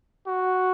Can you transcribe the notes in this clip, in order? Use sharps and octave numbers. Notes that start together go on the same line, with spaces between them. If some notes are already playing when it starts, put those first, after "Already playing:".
F#4